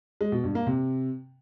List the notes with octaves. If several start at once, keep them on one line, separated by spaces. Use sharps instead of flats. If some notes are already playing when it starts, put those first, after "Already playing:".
G#3
B2
G2
A#3
C3